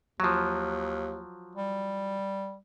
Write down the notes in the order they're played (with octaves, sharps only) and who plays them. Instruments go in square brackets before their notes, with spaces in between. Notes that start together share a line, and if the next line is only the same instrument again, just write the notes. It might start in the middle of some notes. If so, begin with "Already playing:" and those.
[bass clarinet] D#2 [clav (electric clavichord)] F3 F#3
[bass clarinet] G3